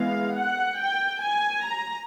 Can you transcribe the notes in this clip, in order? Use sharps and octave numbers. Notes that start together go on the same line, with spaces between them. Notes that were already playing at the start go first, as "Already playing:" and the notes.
Already playing: E3 G#3 B3 F5
F#5
G5
G#5
A#5